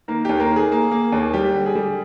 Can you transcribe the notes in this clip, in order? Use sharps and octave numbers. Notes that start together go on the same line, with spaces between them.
D#3 A#3 A#4
D#2 G4
A#3 A#4
D#3
G#4
A#3
A#3
D#2
G3 G4
D3
G#4
G3